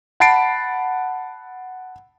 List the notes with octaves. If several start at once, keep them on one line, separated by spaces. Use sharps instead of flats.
F#5 A5 B5 A6 C7 D7